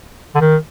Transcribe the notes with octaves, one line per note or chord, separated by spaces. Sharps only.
D3
D#3